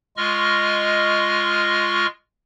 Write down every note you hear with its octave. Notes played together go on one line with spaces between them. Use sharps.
G#3 F4 D#5 C#6 F6